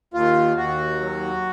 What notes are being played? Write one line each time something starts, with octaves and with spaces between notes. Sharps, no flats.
D#2 F4
D#2 F#4
F#3